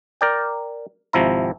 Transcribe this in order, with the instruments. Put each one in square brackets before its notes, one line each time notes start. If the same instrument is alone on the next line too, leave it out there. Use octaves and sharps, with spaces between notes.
[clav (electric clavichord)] A#4 D5 G5
G#1 C3 F3 E4 A#5